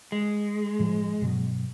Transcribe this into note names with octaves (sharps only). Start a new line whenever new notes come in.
G#3
A2 F3
G2 B2 F#3